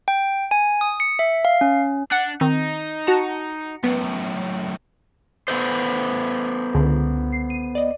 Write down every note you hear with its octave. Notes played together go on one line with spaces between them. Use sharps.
G5
G#5
D#6
C#7
E5
F5
C#4
D4 F#5 F#6
D#3 C4 D#4
F#4 A5 A#5 C#7
F#2 A2 B3
B3 A4 C5
C#2 D3
C7
D#7
D5 D#5